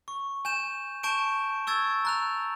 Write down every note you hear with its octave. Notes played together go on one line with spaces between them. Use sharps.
C#6
G#5 G6 E7
A5 C#6 G6 D7 E7
C#6 E6 G#6 A6
A#5 F#6 F7